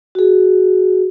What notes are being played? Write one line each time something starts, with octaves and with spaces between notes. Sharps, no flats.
F#4 G#4